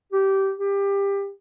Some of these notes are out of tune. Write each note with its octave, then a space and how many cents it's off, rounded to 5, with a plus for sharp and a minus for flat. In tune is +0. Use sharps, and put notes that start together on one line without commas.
G4 -15
G4 +20